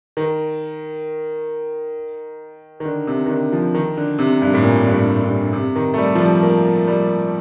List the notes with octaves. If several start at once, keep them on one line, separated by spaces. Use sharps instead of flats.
D#3
D#3
D3
C3
D#3
D3
F3
D#3
D3
C3
G2
A2
A#2
G2
A2
G2
C3
D#3
A3
G3
F3
G3
A#3
G3